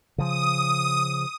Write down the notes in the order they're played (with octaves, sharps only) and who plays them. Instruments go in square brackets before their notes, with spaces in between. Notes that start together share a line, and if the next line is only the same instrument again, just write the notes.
[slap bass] C#3 F3 [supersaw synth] D#6